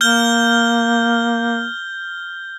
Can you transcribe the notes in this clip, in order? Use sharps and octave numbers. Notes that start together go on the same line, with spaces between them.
A#3 F6 G6 G7